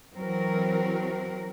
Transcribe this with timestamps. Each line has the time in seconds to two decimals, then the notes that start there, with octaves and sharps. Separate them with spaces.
0.15 E3 F#3 C4 F#4 A#4